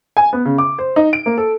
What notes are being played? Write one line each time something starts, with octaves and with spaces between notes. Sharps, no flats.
G#5
B3
C#3
D6
C5
D#4
D7
A#3
A4